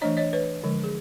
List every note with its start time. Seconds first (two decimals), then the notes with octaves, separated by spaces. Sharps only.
0.01 E3 A3 D4 C#5 D#5
0.17 C#5 D#5
0.33 B4 C#5
0.64 D3 F3 G#3
0.84 G#4